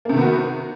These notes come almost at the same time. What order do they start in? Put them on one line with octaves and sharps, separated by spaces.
A#3 C3 D#3 B3 F#4